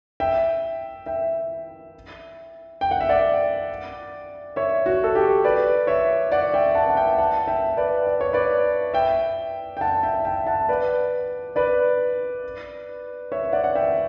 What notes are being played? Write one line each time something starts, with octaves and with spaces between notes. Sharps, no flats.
E5 G5
E5 G5
G5
F#5
E5
D5 F#5
C#5 E5
F#4
A4
G4
B4 D5
C#5 E5
D5 F#5
E5 G5
F#5 A5
F#5
E5 G5
F#5 A5
E5 G5
B4 D5
D5
C#5
B4 D5
E5 G5
G5
F#5 A5
E5 G5
E5 G5
F#5 A5
B4 D5
B4 D5
C#5 E5
D5 F#5
F#5
E5 G5